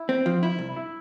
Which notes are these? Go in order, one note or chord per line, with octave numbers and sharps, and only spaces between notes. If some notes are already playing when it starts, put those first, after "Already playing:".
Already playing: E4
C4
F3
E4
C2
E4